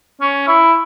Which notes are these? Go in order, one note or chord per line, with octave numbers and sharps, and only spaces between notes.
C#4
E4